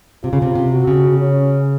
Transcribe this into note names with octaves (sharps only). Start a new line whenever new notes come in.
C3 F4
C#3
C3
C3
F#4
C#3
C#4